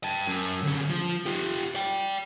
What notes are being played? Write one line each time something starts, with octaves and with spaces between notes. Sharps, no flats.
G5 A5
F#2
D3 C#4
F3
F4 G4
D5 G5